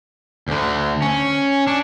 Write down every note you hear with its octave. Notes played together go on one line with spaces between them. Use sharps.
D2 D3
C#4
D4